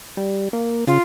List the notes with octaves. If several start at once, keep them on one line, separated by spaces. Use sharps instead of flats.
G3
A#3
C#3 F4